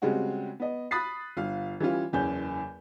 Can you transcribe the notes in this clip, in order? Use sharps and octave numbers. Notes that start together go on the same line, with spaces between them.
C#3 G3 G#3 C4 F#4
B3 D#5
B5 D#6 F#6 A6 B6 C7
G1 F5
E3 G3 C#4 F4
F#1 E2 C#4 G6